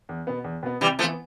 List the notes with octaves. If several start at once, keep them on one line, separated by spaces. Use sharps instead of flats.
E2
B2 B3
E2
B2 B3
C3 E3 G3
E3 F3 A3 B3